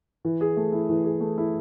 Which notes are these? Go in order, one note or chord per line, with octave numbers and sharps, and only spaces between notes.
E3
G#4
A3
E4
E3
G#4
A3
E4